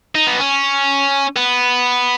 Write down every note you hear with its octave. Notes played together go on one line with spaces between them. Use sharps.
D#4
B3
C#4
B3